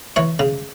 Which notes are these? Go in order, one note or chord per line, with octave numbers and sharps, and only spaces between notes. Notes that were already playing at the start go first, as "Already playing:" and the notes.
E3 C#5
C#3